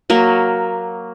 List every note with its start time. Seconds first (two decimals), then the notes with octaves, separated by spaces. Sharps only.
0.10 F#3 A#3